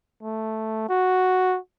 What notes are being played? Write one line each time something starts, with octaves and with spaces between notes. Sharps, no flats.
A3
F#4